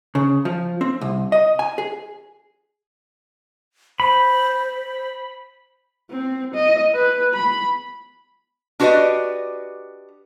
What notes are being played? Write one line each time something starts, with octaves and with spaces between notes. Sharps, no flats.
C#3
F3
C4
C2
D#5
G#5
G#4
C5 B5
C4
D#5
B4
B5
D4 F#4 G4 B4 D5 D#5